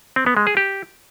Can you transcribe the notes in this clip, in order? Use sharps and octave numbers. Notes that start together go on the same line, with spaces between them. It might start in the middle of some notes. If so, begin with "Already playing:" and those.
C4
B3
G#3
G#4
G4